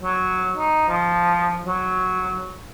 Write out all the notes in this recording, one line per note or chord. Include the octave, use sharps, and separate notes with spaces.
F#3
D#4
F3
F#3